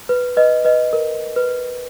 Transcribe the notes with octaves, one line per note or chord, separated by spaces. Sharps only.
B4
B4 D#5
B4 D#5
A#4
B4